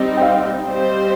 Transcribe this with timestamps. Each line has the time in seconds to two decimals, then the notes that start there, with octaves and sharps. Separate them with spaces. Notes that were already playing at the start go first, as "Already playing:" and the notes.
Already playing: G3 C4 D#4 D#5
0.17 G5
0.22 F5
0.65 G3 C4 G4 C5